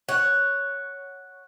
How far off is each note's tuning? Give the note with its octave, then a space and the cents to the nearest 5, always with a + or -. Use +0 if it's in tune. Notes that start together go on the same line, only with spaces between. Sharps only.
C#5 +0 F#5 +0